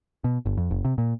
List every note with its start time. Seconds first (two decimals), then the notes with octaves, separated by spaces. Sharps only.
0.24 B2
0.46 G1
0.58 F2
0.71 F#1
0.85 C3
0.98 A#2